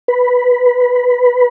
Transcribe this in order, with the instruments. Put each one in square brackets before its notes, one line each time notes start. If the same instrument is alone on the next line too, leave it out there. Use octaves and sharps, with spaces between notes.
[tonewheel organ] B4